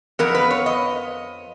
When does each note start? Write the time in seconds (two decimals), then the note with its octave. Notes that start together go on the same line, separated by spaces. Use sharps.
0.19 F2 F3 B3 A#4
0.35 B4
0.50 C#5
0.66 D#5